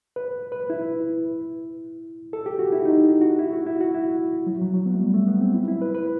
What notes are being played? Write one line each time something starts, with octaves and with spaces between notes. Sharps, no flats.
B4
B4
E4
A4
G4
F#4
E4
D#4
F#4
E4
F#4
E4
F#4
E4
F#3
F#3
F#3
B3
A3
G3
A3
B3
C4
E4
E4
B4
B4